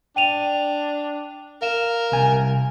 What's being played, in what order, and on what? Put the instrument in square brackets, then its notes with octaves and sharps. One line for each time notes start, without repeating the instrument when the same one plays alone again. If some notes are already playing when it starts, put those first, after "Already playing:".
[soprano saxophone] D4 [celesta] G5 D#7 F7
[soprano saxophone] A#4 [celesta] F5 E7
[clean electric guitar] C2 G#5